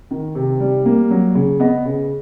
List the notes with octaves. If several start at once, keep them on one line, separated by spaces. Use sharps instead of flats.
D#3
C3
G3
A#3
F#3
C#3
B3 D#5
C#3